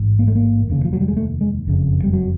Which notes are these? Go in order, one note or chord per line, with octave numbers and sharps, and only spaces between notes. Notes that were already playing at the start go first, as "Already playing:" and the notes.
Already playing: A1 G#2
A#3
A3
A#3
F1 D#2 C#3
F3
F#3
G3
G#3
A3
G#3
F#1 F2 C#3
G3
F#3